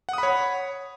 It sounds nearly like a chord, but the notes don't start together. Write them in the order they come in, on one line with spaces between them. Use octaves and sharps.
F#5 D#6 B5 C#5